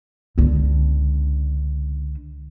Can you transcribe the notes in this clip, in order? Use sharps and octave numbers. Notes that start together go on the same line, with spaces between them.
C#2 D3